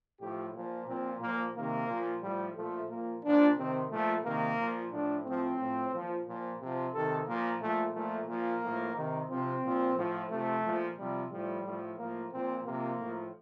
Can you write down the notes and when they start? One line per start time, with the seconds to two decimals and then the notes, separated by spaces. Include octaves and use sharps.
0.20 A2 F3 G4
0.54 A#2 F3
0.87 A#2 F3 C4
1.21 A#2 F3 A#3
1.54 C3 D#3 A#3
1.88 A#2 F3
2.22 A2 F3 G3
2.55 A#2 F3 A3
2.89 A#2 F3 A#3
3.22 A#2 F3 D4
3.56 C3 D#3 C4
3.90 A#2 F3 A3
4.24 C3 D#3 A#3
4.57 A#2 F3
4.91 A2 F3 D4
5.25 A2 F3 C4
5.58 A2 F3
5.92 A#2 F3
6.26 A#2 F3
6.60 C3 F3
6.93 C3 D#3 A4
7.27 A#2 F3 A#3
7.60 A#2 F3 A3
7.94 A#2 F3 A3
8.28 A#2 F3 A#3
8.62 A2 F3
8.95 C3 D#3
9.29 C3 F3 C4
9.63 A#2 F3
9.96 A2 F3
10.30 C3 F3 A3
10.63 A#2 F3
10.97 C3 F3 G3
11.30 A2 F3 G3
11.64 A2 F3
11.98 A2 F3 A#3
12.32 A#2 F3 C4
12.65 C3 F3 A#3
12.99 A2 F3